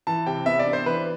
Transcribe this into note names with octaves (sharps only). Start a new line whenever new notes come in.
E3 A5
C3 G5
B3 E5
D5
D4
C5
E3 B4